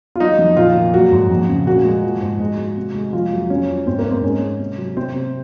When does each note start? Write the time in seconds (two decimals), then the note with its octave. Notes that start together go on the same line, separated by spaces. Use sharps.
0.16 F4
0.20 F#3 D#4
0.39 F2
0.57 A#2 F4
0.75 A#2
0.94 F#3 F#4
1.12 G#2
1.31 F2
1.48 C#3
1.66 A#2 F#4
1.85 G#3
2.03 F3
2.22 G#2
2.40 G#3
2.58 G#3
2.77 C3
2.95 G#3
3.13 F2 F4
3.32 F#3
3.50 F2 C#4
3.69 F3
3.87 G#2 C4
3.99 A#3
4.05 G#2
4.11 C4
4.23 G#3 C#4
4.41 G#3
4.59 C3
4.78 F#3
4.97 C3 C4
5.15 C3